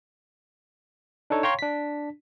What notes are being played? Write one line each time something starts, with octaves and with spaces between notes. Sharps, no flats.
D4 D#4 A4 C#5
C#5 F5 G5 A#5 C6 C#6
D4 B6